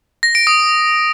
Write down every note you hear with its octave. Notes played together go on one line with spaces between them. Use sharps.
A#6
D7
D#6